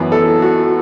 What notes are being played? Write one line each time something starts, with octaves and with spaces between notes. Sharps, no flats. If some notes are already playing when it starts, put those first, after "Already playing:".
Already playing: F#2 E3 B3
A4
F#4